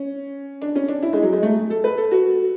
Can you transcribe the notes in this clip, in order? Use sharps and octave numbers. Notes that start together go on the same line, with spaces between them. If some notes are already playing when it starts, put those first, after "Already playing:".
Already playing: C#4
D4
C#4
D4
E4
G#3
F#3
G#3
A3
A4
B4
A4
F#4